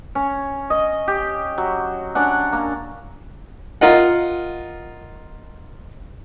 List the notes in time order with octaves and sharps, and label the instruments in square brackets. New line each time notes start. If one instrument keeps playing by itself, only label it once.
[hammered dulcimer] C#4
D#5
G4
F#3
C#4 D4 F#5
A#3
[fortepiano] F4 A#4 D#5 F#5